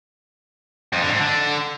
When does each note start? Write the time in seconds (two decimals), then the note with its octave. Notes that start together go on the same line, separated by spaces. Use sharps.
0.93 F2
1.02 D3
1.11 G#2
1.19 D3